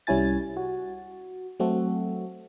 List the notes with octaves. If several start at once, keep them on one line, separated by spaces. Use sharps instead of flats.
C2 G3 C#4 E4 G#5 A6
F#4
F#3 A3 C4 F#4 A4